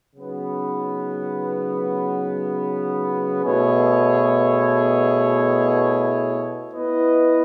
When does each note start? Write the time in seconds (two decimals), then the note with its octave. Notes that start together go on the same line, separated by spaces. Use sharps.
0.15 C#3 F#3 B3 D#4
3.43 B2 A3 E4 G#4 C#5
6.72 B3 E4 B4 D#5